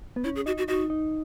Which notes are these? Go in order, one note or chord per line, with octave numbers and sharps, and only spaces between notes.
B3
C#4 E4
G#4
D#4 F#4
F#4
D#4 F#4
D#4